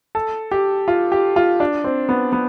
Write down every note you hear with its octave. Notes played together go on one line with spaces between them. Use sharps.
A4
G4
F4
G4
F4
D4
C4
B3
B3